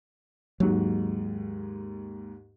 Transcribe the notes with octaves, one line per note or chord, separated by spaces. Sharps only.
D#2 G#2 F#3